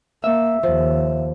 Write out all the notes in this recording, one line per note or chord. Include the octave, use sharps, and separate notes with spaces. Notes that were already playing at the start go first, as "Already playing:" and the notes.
A#3 E5
D#2 F3